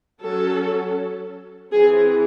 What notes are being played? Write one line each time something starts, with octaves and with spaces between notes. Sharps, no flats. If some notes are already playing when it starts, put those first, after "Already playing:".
F#3 C#4 A4
E3 C4 G#4